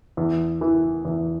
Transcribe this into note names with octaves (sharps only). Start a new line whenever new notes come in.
E2
E3
E2